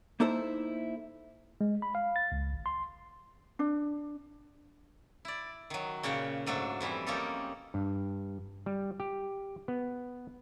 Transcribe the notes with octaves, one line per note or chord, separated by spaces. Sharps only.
A#3 D#4 E4 A4 C5
G#3
B5
F5
A6
C#2
G#1
C6
D4
E4 D5
D#3 F#3
A#2 C#3 C#5 F#5 G5
G#2 F#3 A3 D4
F2 E3 G3 E4
A#3 C#4 D#4 F4 G4 A4
G2
G3
G4
B3